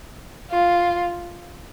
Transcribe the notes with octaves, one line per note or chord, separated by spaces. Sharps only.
F4